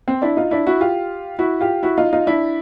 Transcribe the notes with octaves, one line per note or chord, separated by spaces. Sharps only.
C4
D4 E4
D#4 F4
D4 E4
E4 F#4
F4 G4
E4 F#4
F4 G4
E4 F#4
D#4 F4
D#4 F4
D4 E4